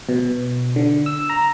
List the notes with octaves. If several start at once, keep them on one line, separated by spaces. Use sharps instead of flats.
B2
D3
E6
A#5